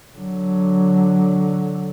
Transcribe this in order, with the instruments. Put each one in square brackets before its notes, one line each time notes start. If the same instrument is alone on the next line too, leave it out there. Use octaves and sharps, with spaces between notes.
[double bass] D3 F#3